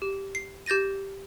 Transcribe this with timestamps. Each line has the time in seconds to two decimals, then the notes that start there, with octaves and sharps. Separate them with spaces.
0.02 G4
0.35 C7
0.66 G4 G6 A6 A#6 D#7